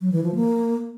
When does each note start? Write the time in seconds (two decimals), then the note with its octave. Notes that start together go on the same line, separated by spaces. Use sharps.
0.01 F#3
0.12 E3
0.23 F3
0.35 A#3